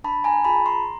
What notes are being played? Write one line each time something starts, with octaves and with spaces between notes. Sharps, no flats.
D4 A5 B5
G#5 A#5
F4 G#4 A5 B5
A#5 C6